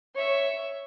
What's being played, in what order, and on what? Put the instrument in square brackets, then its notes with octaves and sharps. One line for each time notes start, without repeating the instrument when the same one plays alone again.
[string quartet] C#5 E5